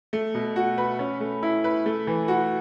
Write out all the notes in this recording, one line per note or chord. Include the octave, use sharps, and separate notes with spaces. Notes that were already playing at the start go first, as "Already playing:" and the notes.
A3
B2
F#4
B4
C#4
A3
E4
B4
A3
E3
F#4